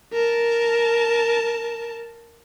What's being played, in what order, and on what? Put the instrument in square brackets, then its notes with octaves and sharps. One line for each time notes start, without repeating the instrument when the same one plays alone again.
[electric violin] A#4 A5